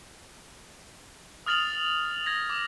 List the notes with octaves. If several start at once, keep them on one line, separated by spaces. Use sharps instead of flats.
D#6 F6 A6 F7 F#7
G#6 A#6
D6